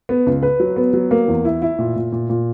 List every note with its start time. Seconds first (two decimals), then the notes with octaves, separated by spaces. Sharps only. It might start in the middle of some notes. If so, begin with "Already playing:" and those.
0.09 B3
0.26 C#2
0.42 B4
0.60 F#3
0.76 B3
0.93 F#3
1.11 A#3
1.28 E2
1.45 E4
1.62 E4
1.79 A#2
1.96 A#2
2.12 A#2
2.30 A#2